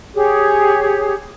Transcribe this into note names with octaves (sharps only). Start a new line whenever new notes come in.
G4 G#4 C#5